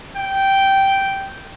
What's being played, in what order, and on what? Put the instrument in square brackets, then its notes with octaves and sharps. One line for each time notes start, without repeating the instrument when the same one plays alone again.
[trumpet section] G5